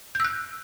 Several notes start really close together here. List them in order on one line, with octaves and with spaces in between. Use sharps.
G6 E6 F#6